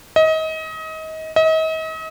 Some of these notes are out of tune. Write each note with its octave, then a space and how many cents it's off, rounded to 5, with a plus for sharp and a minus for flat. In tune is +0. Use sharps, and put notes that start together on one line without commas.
D#5 +30
D#5 +40